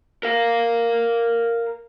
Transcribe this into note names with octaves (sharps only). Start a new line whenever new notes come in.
A#4 F5